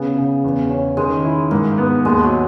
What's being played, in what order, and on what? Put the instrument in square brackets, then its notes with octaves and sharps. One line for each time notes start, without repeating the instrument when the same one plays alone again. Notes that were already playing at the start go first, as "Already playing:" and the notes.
Already playing: [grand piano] C#3 B3
C#3
E2
C#4
[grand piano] D#3 [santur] G#3
[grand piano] E4
[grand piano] G#2 [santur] A#3
[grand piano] B3
[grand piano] D#2 [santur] G#3
[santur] F#3